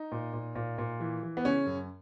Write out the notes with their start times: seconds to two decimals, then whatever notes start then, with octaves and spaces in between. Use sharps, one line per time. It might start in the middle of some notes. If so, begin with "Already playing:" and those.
Already playing: D#4
0.12 A#2
0.33 A#2
0.55 A#2
0.78 A#2
1.00 E3
1.23 E3
1.37 B3
1.45 C#3 C#4
1.66 F#2